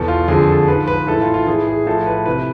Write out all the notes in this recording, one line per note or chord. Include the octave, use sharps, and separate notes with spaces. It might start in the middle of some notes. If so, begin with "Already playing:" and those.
Already playing: E2 B2 A4
F4
F2 D3 F3 G#4
A4
G#2 F3 B4
B4
A2 E3 A4
F4
F4
A2 E3 G#4
G#4
A2 F3 A4
B4
C3 E3 B4